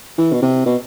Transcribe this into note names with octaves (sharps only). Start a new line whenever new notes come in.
E3
B2
C3
B2